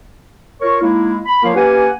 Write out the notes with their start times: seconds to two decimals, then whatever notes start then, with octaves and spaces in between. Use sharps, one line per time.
0.62 F4 A#4 C#5 C#6
0.81 G#3 A#3 D#4 E4
1.26 B5
1.43 F3 A#3 F4 A#4 C#5 F5
1.56 A#3 C#4 G4 B4 F#5 G#5